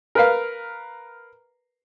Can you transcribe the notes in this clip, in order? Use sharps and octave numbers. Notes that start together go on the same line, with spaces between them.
A#4 B4 F5